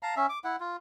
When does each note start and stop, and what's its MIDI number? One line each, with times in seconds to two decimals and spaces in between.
0.03 0.15 77
0.03 0.15 81
0.03 0.15 82
0.16 0.27 61
0.16 0.27 76
0.29 0.39 86
0.44 0.56 64
0.44 0.56 78
0.60 0.77 65